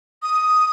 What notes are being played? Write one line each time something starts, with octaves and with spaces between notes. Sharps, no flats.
D#6